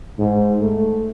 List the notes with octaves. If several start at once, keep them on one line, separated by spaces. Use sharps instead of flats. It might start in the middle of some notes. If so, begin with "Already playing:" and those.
G#2
A3